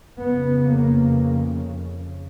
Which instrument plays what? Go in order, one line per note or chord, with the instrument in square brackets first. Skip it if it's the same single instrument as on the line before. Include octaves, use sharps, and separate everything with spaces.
[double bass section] F2 C#3 B3
A#3